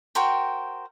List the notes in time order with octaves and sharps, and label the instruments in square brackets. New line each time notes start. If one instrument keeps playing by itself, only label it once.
[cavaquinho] F#4 A#4 C5 G5